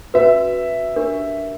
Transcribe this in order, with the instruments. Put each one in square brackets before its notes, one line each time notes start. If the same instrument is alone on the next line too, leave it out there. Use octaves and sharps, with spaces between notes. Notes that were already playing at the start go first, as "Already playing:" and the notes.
[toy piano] C#4 F#4 B4 [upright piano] E5
[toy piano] D4 G4 A#4